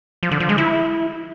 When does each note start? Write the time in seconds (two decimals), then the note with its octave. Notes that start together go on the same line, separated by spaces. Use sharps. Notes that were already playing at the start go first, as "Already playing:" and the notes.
0.23 F3
0.31 D3
0.40 F3
0.49 G#3
0.58 E4